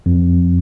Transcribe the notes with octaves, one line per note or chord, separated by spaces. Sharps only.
F2